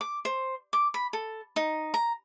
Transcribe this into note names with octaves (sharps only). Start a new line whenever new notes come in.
D6
C5
D6
B5
A4
D#4
A#5